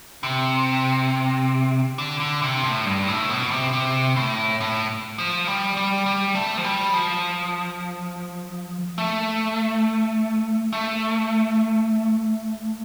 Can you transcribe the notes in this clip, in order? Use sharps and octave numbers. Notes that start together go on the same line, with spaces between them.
C3
D3
D3
C3
A2
G2
A2
B2
C3
C3
A2
A2
F3
G3
G3
G3
A3
F3
G3
F3
A3
A3